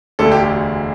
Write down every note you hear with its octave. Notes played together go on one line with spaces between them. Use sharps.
E1 D2 D3 A4
G4